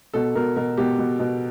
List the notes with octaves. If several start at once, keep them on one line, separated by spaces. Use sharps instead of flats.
B2 A4
B2 A#4
B2 A#4
B2 G4
B2
B2